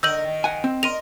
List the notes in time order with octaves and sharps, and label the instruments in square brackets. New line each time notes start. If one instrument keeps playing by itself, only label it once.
[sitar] D3 A#4 D#5 [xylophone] E6 G6 F#7
[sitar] D#3
[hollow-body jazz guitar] F#5 G#5
C4
[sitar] A#4 D#5 [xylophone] C6 D#7 F7